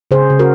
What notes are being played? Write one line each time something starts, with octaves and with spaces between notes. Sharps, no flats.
C#3 G#4 C5
C#3
F#4 A#4